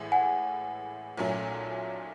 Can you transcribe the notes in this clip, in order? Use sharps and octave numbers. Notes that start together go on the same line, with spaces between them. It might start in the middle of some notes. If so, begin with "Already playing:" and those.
Already playing: A1 A2 E3 G#3
F#5 G#5
B1 A#2 F#3 A3 C#4